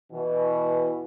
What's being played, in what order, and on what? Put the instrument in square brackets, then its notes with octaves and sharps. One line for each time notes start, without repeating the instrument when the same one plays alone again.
[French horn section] B2 E3